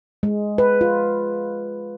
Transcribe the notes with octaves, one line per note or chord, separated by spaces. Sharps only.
G#3
B4
F4